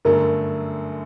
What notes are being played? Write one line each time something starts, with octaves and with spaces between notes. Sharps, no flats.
G1 F#2 D3 F#3 A3 A#4